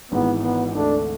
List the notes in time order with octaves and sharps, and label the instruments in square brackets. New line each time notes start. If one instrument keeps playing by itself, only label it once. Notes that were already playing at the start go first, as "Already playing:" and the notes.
[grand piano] G#1 G#2 E3 [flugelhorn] B3
[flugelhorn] B3
[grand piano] D2 D3 A3 [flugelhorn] D4